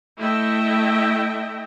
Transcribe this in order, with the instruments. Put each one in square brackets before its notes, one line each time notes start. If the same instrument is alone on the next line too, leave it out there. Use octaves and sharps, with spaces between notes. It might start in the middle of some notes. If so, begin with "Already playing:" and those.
[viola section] A3 E4 D#5 E5 G5